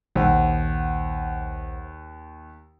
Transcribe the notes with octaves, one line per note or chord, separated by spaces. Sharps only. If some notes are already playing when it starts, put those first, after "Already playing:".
A#1 D#2 C5 F#5